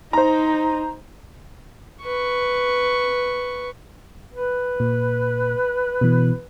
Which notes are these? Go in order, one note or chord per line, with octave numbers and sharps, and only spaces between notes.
D#4 C5 A#5
B4 C#6
B4
A#2
B2 E3